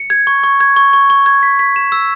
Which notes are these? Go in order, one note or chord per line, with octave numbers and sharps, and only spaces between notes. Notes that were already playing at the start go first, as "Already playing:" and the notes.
Already playing: C#7
G#6
C#6
C#6
G#6
C#6
C#6
C#6
G#6
B6
B6
E7
E6